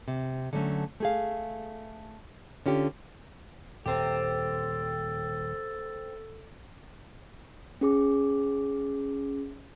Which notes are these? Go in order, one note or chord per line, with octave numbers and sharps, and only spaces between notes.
C3
D3 F#3 G3 A3 C#4
A3 G#4 F5
D3 C#4 F4 G4
D#1 C4 G4 A4
C#4 G#4 D6